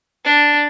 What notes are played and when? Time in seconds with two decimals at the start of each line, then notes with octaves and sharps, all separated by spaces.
0.25 D4